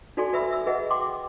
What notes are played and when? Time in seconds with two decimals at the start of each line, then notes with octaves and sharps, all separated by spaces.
0.17 D#4 F#4 A4 D5 G#5 C6
0.33 F#4 B4 E5 B5 E6
0.51 E5 E6
0.67 G#4 B4 D#5 E5 F#5
0.90 F#5 G5 C6 D6